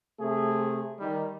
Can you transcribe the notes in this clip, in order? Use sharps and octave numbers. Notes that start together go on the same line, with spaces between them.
C3 A3 G#4
D#3 G3